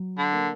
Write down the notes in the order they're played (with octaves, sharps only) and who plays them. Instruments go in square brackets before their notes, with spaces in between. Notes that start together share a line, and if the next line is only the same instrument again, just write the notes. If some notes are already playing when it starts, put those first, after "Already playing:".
Already playing: [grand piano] F#3
[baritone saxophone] D3
[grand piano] A#3